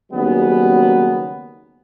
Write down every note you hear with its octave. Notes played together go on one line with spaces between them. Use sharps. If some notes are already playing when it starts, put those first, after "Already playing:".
D#2 C#3 F#3 G3 B3